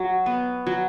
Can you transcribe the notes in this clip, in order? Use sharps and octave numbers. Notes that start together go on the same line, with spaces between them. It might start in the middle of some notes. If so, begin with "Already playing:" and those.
Already playing: F#3
B3
F#3